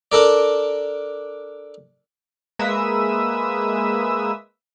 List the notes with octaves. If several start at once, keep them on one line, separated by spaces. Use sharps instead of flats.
D4 A4 A#4 D5
G#3 A#3 B4 E5 D#6 E6